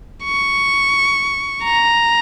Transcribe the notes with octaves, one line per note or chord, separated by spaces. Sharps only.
C#6
A#5